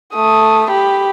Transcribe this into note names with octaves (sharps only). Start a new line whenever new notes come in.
A3 D#6
G4 B5